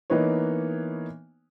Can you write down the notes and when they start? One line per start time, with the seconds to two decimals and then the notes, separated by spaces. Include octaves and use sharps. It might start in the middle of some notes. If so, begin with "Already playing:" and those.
0.10 E3 A#3 B3 D#4 B4 C#5